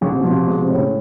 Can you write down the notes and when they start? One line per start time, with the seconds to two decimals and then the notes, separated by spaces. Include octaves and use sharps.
0.01 A1 C#3
0.12 C3
0.21 B2 F3
0.31 C3
0.47 B2 G#3
0.62 C3
0.70 A2
0.77 C#3